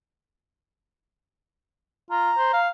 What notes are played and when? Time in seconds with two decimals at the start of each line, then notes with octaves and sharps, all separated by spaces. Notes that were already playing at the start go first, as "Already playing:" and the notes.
2.10 F4 A#5
2.37 C5
2.53 F5